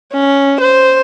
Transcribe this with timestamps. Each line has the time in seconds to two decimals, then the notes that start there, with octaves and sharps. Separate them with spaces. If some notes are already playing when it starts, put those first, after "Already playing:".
0.13 C#4
0.60 C5